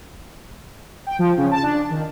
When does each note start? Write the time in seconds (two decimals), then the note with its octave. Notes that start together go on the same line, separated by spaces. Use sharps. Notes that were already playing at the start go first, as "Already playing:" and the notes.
1.07 G5
1.19 F3
1.37 C#3
1.51 A5
1.63 D4
1.90 D#3